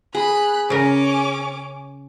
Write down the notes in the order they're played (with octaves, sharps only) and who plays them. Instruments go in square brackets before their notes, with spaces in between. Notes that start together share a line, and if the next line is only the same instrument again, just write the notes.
[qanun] G#4 [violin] B5 F#6
[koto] C#3 A#4 [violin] C#4 D6